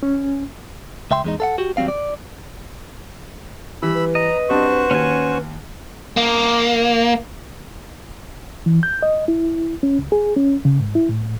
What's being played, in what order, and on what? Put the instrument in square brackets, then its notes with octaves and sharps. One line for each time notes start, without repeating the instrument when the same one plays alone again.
[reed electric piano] C#4
[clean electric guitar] C#2 E5 G5 C6
E2 G#3 D#4
A4 F5 F#5
F#4 G4
D#2 F#3 G3 C4 F5
D5
[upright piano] E3 G3 [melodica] B5 E6
[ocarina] B4
[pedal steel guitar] D#5 [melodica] A#5
[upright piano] G3 C4 D4 [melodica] F#4 C5 C#6
[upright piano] D#2 [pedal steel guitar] C#4 G#5
[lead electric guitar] A#3
[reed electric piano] E3
G6
D#5
E4
C#4
C#2
G#4
C#4
C#3
G#2
E4
A2